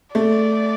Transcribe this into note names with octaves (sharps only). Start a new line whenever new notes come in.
A3 D5